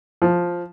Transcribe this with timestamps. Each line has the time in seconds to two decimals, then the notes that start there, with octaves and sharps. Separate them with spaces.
0.22 F3